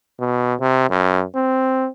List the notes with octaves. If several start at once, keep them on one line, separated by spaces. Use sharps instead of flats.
B2
C3
F#2
C4